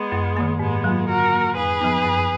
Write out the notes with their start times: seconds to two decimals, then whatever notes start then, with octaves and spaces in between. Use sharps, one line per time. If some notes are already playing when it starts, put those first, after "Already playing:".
Already playing: G#3 B3
0.12 F#2
0.37 D#3 A#3
0.59 G#2 G#3 B3
0.84 F#3 A#3 F4
1.08 D3 F#4 A#4
1.33 F#3 A#3
1.56 F2 G#4 B4
1.80 F3 B3 D#4
2.05 F#2